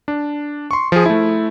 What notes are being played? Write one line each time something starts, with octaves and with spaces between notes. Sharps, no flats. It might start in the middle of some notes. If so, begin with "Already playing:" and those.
D4
C6 C#6
F3 G#4
A3 E4